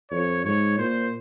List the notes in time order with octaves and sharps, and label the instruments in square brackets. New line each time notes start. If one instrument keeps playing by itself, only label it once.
[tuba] F2 [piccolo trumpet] C#5
[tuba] G#2 [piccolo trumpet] C#5
[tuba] A#2 [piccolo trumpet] C5